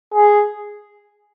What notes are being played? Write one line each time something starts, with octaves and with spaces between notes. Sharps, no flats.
G#4